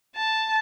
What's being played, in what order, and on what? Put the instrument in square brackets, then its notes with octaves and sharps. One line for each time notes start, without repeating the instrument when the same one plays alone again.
[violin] A5